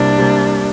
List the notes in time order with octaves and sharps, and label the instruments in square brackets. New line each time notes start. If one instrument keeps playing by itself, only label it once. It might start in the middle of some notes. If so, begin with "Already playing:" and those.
Already playing: [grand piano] C2 C3 G3 A#3 [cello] D4
[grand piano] C3 G3 A#3